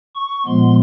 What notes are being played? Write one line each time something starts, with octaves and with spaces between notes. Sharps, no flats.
C#6
A#2 F3 G#3 B3 C6